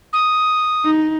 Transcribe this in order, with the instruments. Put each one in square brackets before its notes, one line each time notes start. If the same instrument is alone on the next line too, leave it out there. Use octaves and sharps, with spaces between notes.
[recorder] D#6
[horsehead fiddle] D#4